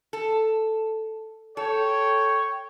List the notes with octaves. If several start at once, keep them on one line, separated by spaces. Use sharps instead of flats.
A4
A4 C#5 G5